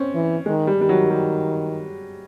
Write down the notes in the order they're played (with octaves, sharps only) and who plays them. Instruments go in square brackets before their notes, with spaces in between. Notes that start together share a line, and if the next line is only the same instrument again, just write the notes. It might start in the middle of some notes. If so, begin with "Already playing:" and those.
Already playing: [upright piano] C4 C#4
[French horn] E3
[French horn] D#3 [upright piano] G#3
[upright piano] G3
[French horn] D#3 [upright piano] G3
[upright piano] F#3
G3